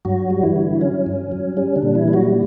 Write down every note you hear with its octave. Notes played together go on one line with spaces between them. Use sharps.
G2 F#3 F#4
G3
E3 E4
D3
F#3 C#4
G2
F#3
G3 C#4
D3 D4
A#2
E3 E4
G3
F#3 F#4